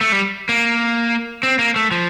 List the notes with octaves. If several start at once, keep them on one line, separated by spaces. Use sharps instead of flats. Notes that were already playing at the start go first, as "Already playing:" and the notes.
A3
G3
A#3
C4
A#3
A3
F3